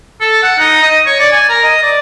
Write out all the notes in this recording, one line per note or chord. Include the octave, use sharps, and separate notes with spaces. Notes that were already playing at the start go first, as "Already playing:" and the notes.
A4
F#5
D#4
D#5
C#5
D5
G#5
A#4
D#5
D5